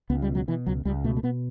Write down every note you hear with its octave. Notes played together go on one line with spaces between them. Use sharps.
C#2 B3
G3
B2
F#3
B2 E3
C#2 F#3
C#2 G3
B2 A3
A3
B2 B3